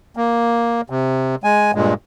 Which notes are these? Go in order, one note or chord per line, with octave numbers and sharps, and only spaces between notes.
A#3
C3
G#3 G#5
G2 A#2 G#3